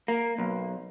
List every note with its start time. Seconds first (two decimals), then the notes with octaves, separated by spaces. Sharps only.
0.08 A#3
0.38 B1